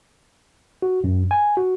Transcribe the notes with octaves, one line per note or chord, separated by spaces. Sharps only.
F#4
F#2
G#5
F#4